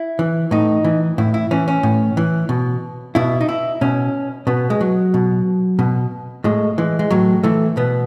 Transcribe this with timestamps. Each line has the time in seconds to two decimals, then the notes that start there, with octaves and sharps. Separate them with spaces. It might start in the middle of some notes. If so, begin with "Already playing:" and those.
Already playing: E4
0.19 E3
0.51 A2 D#4
0.85 E3
1.18 A2 E4
1.34 E4
1.51 E3 C#4
1.68 C#4
1.83 A2
2.17 E3
2.49 B2
3.15 B2 E4
3.41 D#4
3.49 E4
3.81 B2 C#4
4.47 B2 B3
4.70 G#3
4.81 F#3
5.14 B2
5.79 B2
6.44 A2 G#3
6.78 E3 G#3
6.99 G#3
7.11 A2 F#3
7.44 E3 A3
7.77 B2 B3